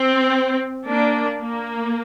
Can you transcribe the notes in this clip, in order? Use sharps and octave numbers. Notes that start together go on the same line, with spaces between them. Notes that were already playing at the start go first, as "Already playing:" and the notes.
Already playing: C4
A#3 D4
A#3